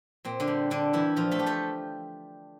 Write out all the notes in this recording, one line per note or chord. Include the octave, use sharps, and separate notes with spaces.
A#2 C4
D3 D4
G3
A#2 D3 D4
E3 G3 E4
A#2 F3 F4
A3 A4
F3 G4
A3 A4